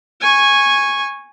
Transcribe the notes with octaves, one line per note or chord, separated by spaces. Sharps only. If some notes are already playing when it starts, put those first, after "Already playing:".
G#5 C#6